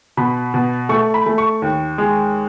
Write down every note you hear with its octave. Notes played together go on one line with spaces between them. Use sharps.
B2 B5
B2
A3 C#6
B5
A3
C#6
D#2
G#3